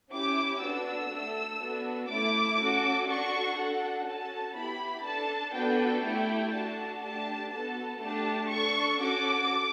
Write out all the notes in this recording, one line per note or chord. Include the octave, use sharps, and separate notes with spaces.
C#4 E4 G4 D6
B3 D4 F#4 A4 E6
A3 D4 A4
B3 D4 F#4 A4
A3 C#4 E4 D6
C#4 F#4 A4
D4 F#4 A4 C#6
D4 F#4 A4 F#5
C#4 F#4 A4 A5
B3 E4 G4 B5
D4 A4 A5
B3 D4 F#4 A4 G5
A3 E4 G4 G5
D4 F#4 A4 A5
A3 D4 G4 A5
B3 F#4 A4 A5
A3 D4 G4 A5
D4 A4 C#6
C#4 F#4 A4 D6